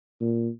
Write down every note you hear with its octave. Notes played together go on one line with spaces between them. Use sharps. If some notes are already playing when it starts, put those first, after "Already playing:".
A#2